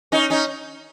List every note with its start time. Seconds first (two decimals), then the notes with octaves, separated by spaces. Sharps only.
0.12 C#4 D#4
0.30 C#4 D#4